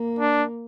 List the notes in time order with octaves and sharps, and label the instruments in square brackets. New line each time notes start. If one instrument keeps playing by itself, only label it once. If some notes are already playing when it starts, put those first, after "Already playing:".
Already playing: [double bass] A#3
[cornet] D4